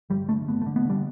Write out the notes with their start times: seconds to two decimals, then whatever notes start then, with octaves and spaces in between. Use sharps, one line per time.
0.10 G1 G3
0.29 D3 A3
0.48 G1 B3
0.62 D3 A3
0.76 B3
0.85 D3 G3